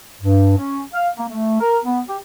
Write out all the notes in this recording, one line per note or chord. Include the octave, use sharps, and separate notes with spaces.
G2
C#4
F5
A#3
A3
A#4
B3
G4